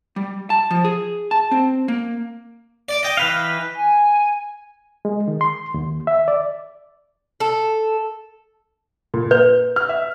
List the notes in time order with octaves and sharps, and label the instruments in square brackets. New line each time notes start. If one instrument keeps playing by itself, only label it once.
[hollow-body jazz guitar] G3
A5
F3
G#4
A5
C4
A#3
[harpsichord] D5 D6
D#5 G5
[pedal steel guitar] E3 B4 F5
[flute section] G#5
[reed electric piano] G#3
D#3
C6
D#2
E5
D5
[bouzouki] A4
[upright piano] A#2
[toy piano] B4 [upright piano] G6
[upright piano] F6
E5